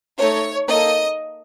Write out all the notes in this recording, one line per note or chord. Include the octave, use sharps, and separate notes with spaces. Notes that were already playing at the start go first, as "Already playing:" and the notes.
A3 D#4 A4 C#5
A#3 D#4 A4 D#5